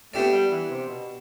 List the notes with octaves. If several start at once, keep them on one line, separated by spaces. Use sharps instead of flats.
A3 B3 D4 G4 D5
G3
E3
C3
B2